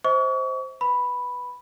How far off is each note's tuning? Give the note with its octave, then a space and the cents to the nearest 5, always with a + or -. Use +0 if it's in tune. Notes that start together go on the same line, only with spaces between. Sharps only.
C5 +0 D#5 +40 C#6 +35
B4 +0 B5 +0